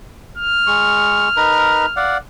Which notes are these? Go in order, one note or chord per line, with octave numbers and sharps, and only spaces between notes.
F6
G#3 C#6
D#4 A#4 B4
D5 F5 F#5